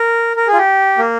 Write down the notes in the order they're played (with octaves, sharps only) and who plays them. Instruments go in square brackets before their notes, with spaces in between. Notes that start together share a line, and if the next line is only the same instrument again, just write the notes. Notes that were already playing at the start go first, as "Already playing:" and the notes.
Already playing: [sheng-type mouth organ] A#4
A#4
G#4
F4
G4
A#3